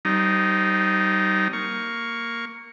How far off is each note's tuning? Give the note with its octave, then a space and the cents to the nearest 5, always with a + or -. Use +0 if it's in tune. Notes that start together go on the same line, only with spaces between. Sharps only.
G3 -30 C4 +0 D#4 +0
A#3 +0 C#6 +10